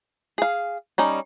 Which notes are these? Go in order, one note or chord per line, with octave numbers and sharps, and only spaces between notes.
G#4 F5
G3 C#4 D#4